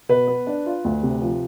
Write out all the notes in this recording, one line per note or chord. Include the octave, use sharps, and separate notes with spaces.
B2 B4
B3
D4
F4
D2
C3
F3